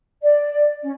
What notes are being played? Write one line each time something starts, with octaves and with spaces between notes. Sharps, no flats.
D5
C#4